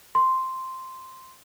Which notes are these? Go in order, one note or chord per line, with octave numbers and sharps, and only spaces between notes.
C6